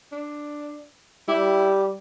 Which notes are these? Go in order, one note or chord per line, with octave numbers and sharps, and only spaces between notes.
D4
G3 E4 G4